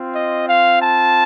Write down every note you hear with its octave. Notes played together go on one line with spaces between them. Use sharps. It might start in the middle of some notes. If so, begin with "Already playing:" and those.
Already playing: C4 F4
D#5
F5
A5